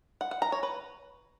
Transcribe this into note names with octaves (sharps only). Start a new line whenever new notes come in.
F#5
F#5
A#5
C#5
B4